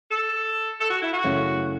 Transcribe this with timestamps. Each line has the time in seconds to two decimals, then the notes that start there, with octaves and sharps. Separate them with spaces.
0.11 A4
0.79 A4
0.90 F#4
1.02 E4
1.13 F#4
1.24 F#2 C#3 E3 A3 C#4